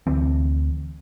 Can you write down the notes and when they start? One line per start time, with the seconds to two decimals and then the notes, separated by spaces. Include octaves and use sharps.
0.07 D2 E3 C4